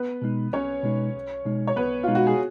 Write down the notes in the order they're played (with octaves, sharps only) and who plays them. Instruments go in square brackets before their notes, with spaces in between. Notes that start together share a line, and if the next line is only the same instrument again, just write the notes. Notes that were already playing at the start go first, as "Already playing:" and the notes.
Already playing: [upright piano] B3 B4
[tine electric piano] B2 G#3 D#4
[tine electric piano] B1 [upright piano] C#4 C#5
[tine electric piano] B2 G#3 D#4
B1
B2 G#3 D#4
[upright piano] C#5
[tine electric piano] B1 [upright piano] B3 B4
[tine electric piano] B2 G#3 D#4 [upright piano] F4
[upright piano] F#4
G#4